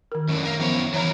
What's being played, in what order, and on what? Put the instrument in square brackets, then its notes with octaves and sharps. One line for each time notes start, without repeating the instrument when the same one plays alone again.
[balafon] D#3 A#4
[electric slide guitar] F#2 A2 D3
A#4 F5
[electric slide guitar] F#2 E4 C#5 [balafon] F3 B3
[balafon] E3 C#5 A#5 [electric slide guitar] F#3 E4 A#4